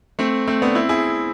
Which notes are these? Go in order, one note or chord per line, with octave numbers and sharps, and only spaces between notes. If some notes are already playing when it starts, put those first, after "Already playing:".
A3 C4
A3 C4
B3 D4
C4 E4
E4 G#4